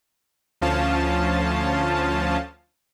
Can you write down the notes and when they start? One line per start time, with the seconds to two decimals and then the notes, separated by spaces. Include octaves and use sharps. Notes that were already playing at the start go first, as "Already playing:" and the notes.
0.62 D2 F3 C#4 F4 A5